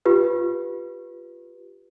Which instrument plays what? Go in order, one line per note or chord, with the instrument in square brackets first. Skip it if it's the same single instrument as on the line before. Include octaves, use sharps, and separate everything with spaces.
[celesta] F4 G4 B4